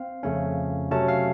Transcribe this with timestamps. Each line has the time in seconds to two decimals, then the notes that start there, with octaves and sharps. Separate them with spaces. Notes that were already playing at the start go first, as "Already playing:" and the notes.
Already playing: C4 F5
0.23 F2 C#3 A3 C#4
0.91 C3 F#3 A3 C#4 A5
1.08 F5